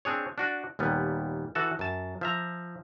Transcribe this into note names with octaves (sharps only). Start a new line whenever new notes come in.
C4 D4 G#4 C#5
D4 F#4 D5
D#2 A#2 G3 B3
E3 F#4 A4 A5
F#2 A5
F3 E5 A#5